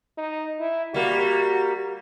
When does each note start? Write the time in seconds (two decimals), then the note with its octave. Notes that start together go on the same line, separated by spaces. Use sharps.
0.18 D#4
0.60 E4
0.94 G3 A#3 F#4